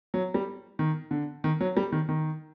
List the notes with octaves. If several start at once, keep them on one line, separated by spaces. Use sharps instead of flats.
F#3
G3
D#3
D3
D#3
F#3
G3
D#3
D#3